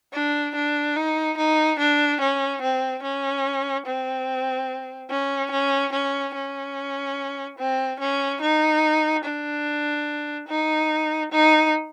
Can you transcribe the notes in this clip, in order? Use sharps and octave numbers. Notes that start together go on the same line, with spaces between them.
D4
D4
D#4
D#4
D4
C#4
C4
C#4
C4
C#4
C#4
C#4
C#4
C4
C#4
D#4
D4
D#4
D#4